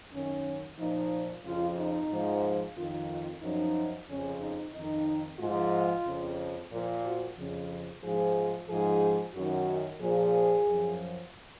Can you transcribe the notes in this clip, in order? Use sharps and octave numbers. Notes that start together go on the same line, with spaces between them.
F#2 D#3 C#4
A#2 F3 D#4
F2 C#3 F3 F4
D#4
G#2 F3
F2 D#3 F4
F#2 F3 D#4
F2 C#3 F3 C#4
D#4
F2 D#3 D#4
G#2 F3 F4
F2 C#3 F3
A#2 F3
F#4
F2 C#3 F3
G#2 F3 G#4
G#2 F3 G#4
F#2 D#3 F#4
A#2 F3 G#4
F#2 F3